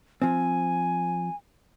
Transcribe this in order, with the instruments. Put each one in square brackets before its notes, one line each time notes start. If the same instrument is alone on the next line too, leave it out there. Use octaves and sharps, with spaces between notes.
[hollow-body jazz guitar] F3 C4 [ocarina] G#5